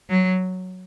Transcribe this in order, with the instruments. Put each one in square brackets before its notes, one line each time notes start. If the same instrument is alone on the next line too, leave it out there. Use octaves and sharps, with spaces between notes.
[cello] F#3